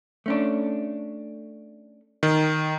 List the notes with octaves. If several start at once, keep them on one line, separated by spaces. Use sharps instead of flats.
A3 C#4 D4
D#3